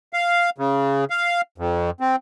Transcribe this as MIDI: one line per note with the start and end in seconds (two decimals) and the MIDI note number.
0.13 0.50 77
0.58 1.05 49
1.10 1.41 77
1.58 1.90 41
2.00 2.16 60